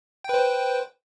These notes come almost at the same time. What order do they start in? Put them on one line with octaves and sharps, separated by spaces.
G5 B4 C5